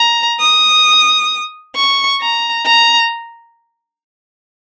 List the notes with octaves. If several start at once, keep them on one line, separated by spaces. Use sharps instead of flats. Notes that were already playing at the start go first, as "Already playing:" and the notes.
Already playing: A#5
D#6
C#6
A#5
A#5